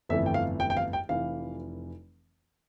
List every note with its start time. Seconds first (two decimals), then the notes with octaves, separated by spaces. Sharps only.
0.09 G1 F2 E3 A3 E5
0.26 G5
0.34 F5
0.60 G5
0.70 G5
0.77 F5
0.93 G5
1.09 F1 F2 E3 F5